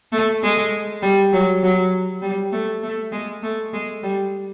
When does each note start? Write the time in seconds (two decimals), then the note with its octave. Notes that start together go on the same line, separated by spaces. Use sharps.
0.12 A3
0.43 G#3
1.02 G3
1.33 F#3
1.63 F#3
2.22 G3
2.52 A3
2.83 A3
3.12 G#3
3.43 A3
3.73 G#3
4.03 G3